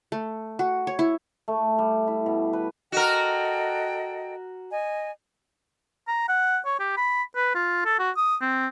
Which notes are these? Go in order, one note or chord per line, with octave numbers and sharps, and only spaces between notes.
A3
F#4
C#5
E4
A3
G3
E4
B2
B4
F#4 A4 A#4 D#5 G5
D#5 G#5
A#5
F#5
C#5
G4
B5
B4
F4
A4
F#4
D#6
C4